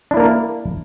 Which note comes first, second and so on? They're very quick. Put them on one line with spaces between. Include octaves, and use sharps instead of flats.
D4 E4 A#3 A#4